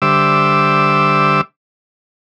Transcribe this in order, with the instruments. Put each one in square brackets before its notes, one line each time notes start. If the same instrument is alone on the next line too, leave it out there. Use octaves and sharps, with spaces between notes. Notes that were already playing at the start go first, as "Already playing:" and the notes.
[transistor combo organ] D3 G3 C5 E5 D6 E6